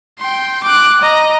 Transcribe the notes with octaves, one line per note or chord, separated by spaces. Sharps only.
G5 C6
D6 F#6
D#5 A#5